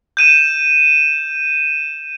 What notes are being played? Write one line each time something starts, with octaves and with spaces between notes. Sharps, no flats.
G6 D#7 E7